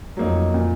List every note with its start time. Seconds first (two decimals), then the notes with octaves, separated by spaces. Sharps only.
0.17 F2 F#3 A#3 D#4
0.54 A#2